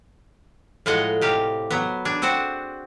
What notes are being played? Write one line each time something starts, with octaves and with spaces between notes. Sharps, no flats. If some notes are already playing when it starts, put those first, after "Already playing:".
A2 F3 G#3 D#5 F#5
C3 G4 F5
F#3 B3
D4 G#4
C4 F#4 C5 F#5